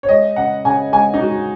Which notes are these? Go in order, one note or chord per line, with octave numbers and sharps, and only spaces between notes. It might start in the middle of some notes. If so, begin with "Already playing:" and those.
C#5
G#3 D#5
C#3 F#5
C#3 G#5
G#3 G#5
D#4
G#3 F#4